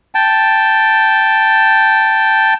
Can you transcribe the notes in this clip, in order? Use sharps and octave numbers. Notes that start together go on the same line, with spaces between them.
G5 A5